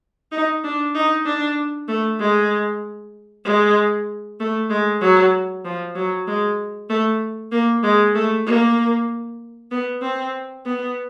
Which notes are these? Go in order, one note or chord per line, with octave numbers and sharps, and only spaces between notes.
D#4
D4
D#4
D4
A3
G#3
G#3
A3
G#3
F#3
F3
F#3
G#3
A3
A#3
G#3
A3
A#3
B3
C4
B3